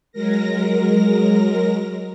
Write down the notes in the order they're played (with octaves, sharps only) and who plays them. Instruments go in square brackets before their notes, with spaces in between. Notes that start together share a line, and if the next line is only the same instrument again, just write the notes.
[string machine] F#3 G#3 A#4 A#6